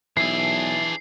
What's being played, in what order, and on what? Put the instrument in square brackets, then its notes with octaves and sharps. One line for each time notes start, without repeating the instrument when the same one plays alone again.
[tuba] B1 [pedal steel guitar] E3 E4 [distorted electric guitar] D4 G#4 [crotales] C7